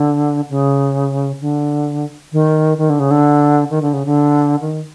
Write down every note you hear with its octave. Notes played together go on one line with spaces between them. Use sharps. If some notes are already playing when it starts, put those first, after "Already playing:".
Already playing: D3
C#3
D3
D#3
D#3
D3
C#3
D3
D#3
D3
C#3
D3
D#3